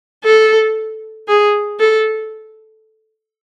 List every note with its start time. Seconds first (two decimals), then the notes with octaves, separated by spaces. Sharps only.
0.24 A4
1.28 G#4
1.80 A4